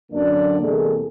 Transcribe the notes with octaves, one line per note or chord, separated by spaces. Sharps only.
F#2 D3 F#3 A#3 D4 D5
E2 C3 G#3 A#3 G#4 A4